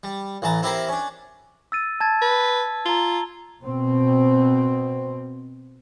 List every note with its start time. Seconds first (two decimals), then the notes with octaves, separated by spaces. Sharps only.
0.03 G3
0.42 A1 E3 A5 A#5
0.62 C4 E4 G4 A#4 C5
0.88 C#4 D4
1.72 E6 A6 D#7
2.00 A5 G#6 A6
2.22 B4
2.86 F4 A#5 G7
3.62 B2 C4